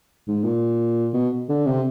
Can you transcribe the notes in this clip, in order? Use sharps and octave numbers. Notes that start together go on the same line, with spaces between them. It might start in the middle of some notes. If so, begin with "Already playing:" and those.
G#2
A#2
B2
D3
C3